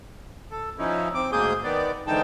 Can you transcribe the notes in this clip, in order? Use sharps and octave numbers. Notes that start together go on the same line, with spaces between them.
A4
F3 C#4 D#4 E4
C4 D6
D2 G#2 A#3 G#4 D#6 G6
D#3 B3 D5
G#2 D3 E3 D#4 G5 A5